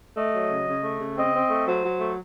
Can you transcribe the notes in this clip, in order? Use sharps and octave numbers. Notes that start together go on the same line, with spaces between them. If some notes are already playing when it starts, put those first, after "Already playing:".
A3 D#5
F#3
C#3
C#3
A3
C#3
C4 D#5
C4
A3
F#3 C5
F#3
A3